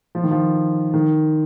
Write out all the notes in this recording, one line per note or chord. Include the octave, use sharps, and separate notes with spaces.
F3
D#3
F3
D#3